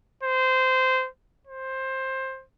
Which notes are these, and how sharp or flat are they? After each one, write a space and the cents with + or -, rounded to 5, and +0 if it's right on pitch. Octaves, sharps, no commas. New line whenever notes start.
C5 -20
C5 +15